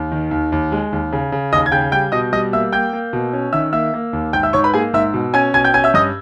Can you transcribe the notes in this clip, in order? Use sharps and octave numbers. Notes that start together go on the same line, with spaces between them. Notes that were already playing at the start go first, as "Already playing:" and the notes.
Already playing: D#2
D#3
D#2
D#2
G#3
D#2
C#3
C#3
D#2 D#5 D#6
G#6
C#3 G5 G6
G3 G5 G6
B2 D#5 D#6
G3 D#5 D#6
A#3 E5 E6
A#3 G5 G6
A#3
B2
C#4
D#3 E5 E6
A#3 E5 E6
A#3
D#2
G#2 G5 G6
E5 E6
G#2 C#5 C#6
B4 B5
A#3 G#4 G#5
G#2 E5 E6
B2
C#4 G#5 G#6
B2 G#5 G#6
G5 G6
C#4 G#5 G#6
E5 E6
G2 D#5 D#6